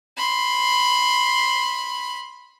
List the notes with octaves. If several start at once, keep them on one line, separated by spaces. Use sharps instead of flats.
B5 C6